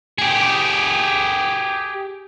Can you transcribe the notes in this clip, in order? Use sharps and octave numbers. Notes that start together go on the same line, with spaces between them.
G4 G#4